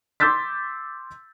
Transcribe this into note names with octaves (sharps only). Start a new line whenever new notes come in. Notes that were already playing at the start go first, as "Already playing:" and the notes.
C6 D6 E6 G6 A6 B6